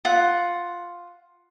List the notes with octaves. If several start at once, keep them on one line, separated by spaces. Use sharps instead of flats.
F4 F#5